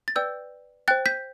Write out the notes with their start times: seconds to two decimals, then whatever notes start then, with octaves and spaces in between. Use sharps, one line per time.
0.08 A6
0.16 B4 D5 G5 E6 G6
0.88 C5 G5 F#6 A6
1.06 G6 B6